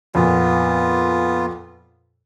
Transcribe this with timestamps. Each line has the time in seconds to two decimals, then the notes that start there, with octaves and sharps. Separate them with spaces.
0.15 F2 A#2 B3 F4